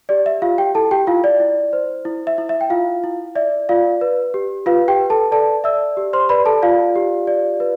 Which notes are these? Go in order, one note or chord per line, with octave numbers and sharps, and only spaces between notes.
G4 D5
E5
F4 G4 F5
G4 G5
E4 A4 A5
G4 G5
E4 F4 F5
D5
E4
C5
E4
E5
E4
E5
G5
E4 F4 F5
E4
D5 E5
F4 D5 F5
B4
G4
F4 B4 F5
G4 G5
B4
A4 A5
A4 D5 A5
D5 E5 E6
G4
C5 C6
B4 D5 B5
A4 A5
F4 D5 F5
G4
D5
B4